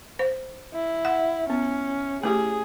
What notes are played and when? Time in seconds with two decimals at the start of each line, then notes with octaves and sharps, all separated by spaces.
0.19 C5
0.74 E4
1.05 F#5
1.50 B3 C#4
2.23 A3 E4 G4 G#4